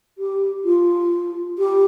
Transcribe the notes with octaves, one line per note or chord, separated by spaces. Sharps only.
G4
F4
G4